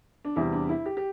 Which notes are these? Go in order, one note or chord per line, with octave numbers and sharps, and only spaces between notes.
D4
E2 C3 G3 E4
D4
E4
G4
G4